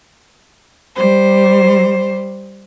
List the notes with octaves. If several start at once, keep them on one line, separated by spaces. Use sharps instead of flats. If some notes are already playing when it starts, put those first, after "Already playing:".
G3 C5